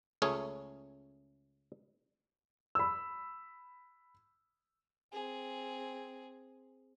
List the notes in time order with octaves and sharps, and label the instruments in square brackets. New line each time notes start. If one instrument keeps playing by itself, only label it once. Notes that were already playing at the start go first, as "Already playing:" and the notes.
[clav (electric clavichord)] C#2 A3 C#4 G#4
[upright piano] B5 E6
[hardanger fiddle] C4 G#4